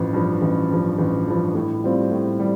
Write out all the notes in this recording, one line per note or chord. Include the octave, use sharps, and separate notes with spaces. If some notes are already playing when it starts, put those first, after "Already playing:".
Already playing: A1 G2 F3
G2 F3
A1
G2 F3
A1
G2 F3
A2
G3 C4 F4
A2
G3